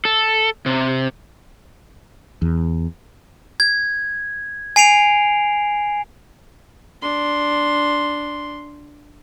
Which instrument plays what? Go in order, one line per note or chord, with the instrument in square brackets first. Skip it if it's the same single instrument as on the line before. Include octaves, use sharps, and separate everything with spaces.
[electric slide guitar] A4
C3
[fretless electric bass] E2
[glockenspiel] G#6
G#5 C7 D7 F7
[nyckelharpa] D4 C6